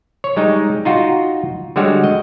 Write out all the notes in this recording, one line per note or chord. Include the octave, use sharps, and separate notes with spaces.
C#5
G3 G#3 D#4
D#4 F4 F#4
D3 G3 G#3 F#4 C#5
D#5